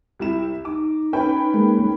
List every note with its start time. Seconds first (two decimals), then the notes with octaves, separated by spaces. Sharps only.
0.19 C2 E4 E7
0.65 D#4 D6
1.13 C#4 B4 G5
1.54 G#3 A#3